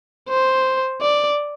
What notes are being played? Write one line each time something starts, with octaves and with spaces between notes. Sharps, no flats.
C5
D5